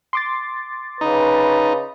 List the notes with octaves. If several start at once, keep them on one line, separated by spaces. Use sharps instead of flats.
C6 D6 A6
C#3 D#4 B4